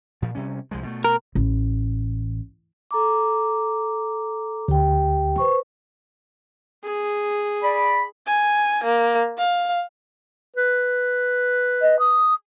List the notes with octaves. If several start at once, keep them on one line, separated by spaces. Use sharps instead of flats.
A#2 F3
C3 G3 C#4
C2 F3 G#3
B2 G#3 A3
A#4
A1
A4 A#5 D6
D2 G4 G5
B4 C5 C#6
G#4
D5 B5
G#5
A#3
F5
B4
D#5
D#6